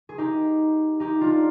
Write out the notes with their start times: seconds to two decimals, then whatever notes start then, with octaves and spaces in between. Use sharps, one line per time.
0.09 G#4
0.18 D#4 G4
1.00 D#4 G4
1.21 D4 F4